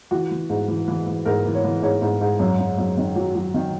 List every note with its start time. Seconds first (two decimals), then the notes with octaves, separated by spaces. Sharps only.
0.11 E3 F#4
0.31 E3
0.50 G#2
0.68 E3
0.88 E3
1.07 E3
1.26 G#2 A#4
1.45 E3
1.55 C#5
1.64 E3
1.83 G#2 C#5
2.02 G#2
2.21 G#2
2.39 F#2
2.59 F#2
2.78 F#2
2.97 D#3
3.16 F#3
3.35 F#3
3.54 D#3